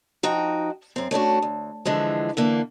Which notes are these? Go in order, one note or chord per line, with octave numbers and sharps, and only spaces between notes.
F3 D#4 F#4 G5
F#2 C4
A3 C#4 D4 F#4
D2
D3 E3 F3 G#3
D3 E3 A#3